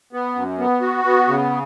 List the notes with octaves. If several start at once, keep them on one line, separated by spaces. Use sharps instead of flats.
B3
F#2
B3
F#4
B3
C#3